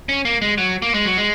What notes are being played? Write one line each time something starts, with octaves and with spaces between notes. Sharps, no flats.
C#4
A#3
G#3
F#3
A#3
G#3
F#3
G#3